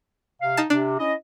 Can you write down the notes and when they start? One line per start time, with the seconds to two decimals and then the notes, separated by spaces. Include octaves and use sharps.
0.42 C3 F5
0.57 D#4 A5
0.70 C3 D4
0.99 C#4 E4 D#5